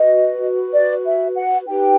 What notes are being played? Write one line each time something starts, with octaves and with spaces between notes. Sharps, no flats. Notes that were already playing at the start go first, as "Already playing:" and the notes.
Already playing: F#4 B4 D#5
D5
E5
F#5
D#4 G4 B4 G5